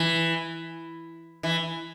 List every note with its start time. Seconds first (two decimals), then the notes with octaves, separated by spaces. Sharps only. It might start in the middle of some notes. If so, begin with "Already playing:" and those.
Already playing: E3
1.43 E3